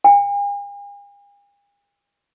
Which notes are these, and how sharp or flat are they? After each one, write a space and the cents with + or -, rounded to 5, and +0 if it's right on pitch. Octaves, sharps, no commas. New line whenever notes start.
G#5 -45